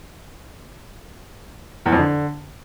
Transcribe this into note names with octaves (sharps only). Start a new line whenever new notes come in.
E2
F2
D3